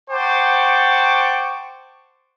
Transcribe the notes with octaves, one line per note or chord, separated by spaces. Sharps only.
C5 F#5 G5 A5 C#6 D6